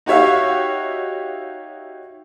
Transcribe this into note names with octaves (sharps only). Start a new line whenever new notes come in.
D#4 F#4 G4 C#5 E5 F5